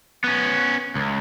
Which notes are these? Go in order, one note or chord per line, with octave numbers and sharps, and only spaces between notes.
B3 C#4
C#2